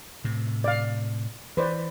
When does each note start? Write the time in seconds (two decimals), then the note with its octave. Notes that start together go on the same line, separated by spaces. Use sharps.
0.24 A2 C3
0.64 D5 F5
1.57 E3 B4 C5 D5